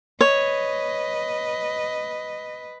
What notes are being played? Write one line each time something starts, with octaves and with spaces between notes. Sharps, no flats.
B4 C#5 D#5